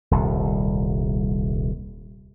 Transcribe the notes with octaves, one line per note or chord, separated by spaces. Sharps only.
D#1 C2